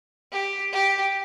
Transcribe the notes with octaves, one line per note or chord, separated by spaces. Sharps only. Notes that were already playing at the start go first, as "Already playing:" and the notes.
G4
G4